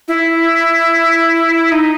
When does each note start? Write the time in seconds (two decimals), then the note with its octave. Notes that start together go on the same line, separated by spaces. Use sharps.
0.08 E4
1.72 D#4